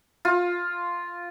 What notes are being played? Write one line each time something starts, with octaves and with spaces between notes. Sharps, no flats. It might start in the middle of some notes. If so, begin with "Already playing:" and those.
F4